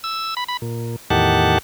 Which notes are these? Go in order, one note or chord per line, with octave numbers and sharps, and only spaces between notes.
E6
B5
B5
A#2
E2 A2 D#3 G4 F#5 A5